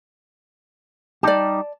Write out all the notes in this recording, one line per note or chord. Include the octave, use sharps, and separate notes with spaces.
G3 D#4 G4 D5 A5